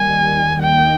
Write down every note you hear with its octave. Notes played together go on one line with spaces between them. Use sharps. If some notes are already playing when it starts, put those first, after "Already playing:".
Already playing: D#2 D#3 G3 G#5
D#2 D#3 A#3 D#4 G5